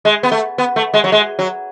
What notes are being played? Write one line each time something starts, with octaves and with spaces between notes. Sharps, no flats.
G#3
B3
A3
B3
A3
G#3
F#3
G#3
F#3